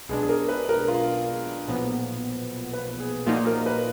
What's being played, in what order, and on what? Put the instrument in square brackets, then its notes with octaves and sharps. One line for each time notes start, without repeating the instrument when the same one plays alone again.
[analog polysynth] B1 B2 G#3 D4 [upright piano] G#4
[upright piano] G#4
A#4
B4
A#4
F4
[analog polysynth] B1 A#2 F3 B3
[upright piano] B4
G#4
[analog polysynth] A#2 F3 A#3 D#4 [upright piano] F#4
[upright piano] A#4
B4